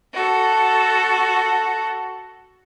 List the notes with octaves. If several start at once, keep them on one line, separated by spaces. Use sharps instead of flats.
F#4 A4